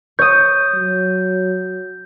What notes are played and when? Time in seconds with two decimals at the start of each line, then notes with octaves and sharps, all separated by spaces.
0.19 C#5 D#6 G6
0.75 F#3